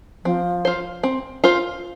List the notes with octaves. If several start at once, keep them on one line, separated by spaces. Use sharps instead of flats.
F3 C4
F4 C5
C4
F4 C5